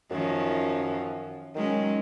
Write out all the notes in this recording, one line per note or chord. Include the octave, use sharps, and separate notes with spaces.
F#2 D#3 F3 C#4
D#3 F#3 G#3 C#4